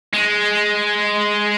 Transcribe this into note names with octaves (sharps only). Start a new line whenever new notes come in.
G#3